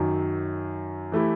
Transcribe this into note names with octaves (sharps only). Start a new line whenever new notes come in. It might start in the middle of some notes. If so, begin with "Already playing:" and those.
Already playing: F#2 D#3 F#3
E3 A3 E4 G4